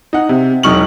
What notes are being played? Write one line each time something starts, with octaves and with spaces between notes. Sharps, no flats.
D#4 F#5
C3
E1 F#3 D#4 C#6 F6 F#7